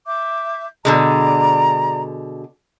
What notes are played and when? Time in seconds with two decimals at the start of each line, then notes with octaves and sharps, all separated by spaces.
0.07 E5 D6 G6
0.85 B2 D3 G#3 D5 A#5